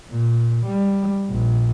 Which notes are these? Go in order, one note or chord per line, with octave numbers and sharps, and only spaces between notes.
A#2
G3
A#1